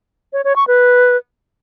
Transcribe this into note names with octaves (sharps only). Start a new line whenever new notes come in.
C#5
C#5
C#6
B4